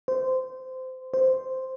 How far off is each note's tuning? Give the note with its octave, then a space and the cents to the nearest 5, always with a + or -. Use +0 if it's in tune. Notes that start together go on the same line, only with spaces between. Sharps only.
C5 -20
C5 -5